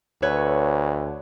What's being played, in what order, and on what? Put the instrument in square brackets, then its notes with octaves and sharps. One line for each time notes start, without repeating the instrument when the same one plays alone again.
[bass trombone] D2 [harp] A4 B4 C#5